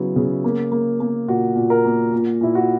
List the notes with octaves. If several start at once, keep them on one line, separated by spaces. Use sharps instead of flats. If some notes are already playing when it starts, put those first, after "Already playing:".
Already playing: C#3 F#3 B3 E4
C#3
A#3
A#3
A#3
A#2 F#4
A#2
A#4
A#3
A#2
A#2 E4
F#4